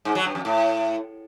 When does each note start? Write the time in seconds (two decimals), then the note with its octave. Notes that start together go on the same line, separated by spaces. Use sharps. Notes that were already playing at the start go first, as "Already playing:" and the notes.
0.05 G#2
0.15 F#3
0.25 G2
0.35 F2
0.45 A2